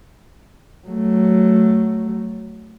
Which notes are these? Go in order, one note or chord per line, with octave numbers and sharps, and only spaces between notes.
F#3 A3